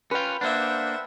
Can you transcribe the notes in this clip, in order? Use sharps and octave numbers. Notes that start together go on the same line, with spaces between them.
C#4 F4 B4 G5
A#3 D4 C5 E5 F#5